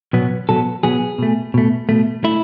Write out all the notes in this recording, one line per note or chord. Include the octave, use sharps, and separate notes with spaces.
B2 F#3 B3
B2 F#3 B3 A4
B2 F#3 B3 G#4
B2 A3
B2 A3
B2 A3
A3 E4